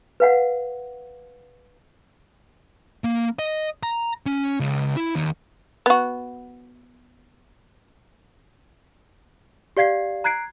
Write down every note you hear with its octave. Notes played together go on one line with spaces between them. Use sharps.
B4 F5 F#5
A#3
D#5
A#5
C#4
C#2
E4
D#2
B3 F#4
G4 D5 F5 G#6 C7
A#5 F#6 G#6 C7 D7